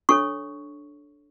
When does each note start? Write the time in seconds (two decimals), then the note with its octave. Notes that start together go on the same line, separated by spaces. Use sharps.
0.09 D4 A4 C#5 C#6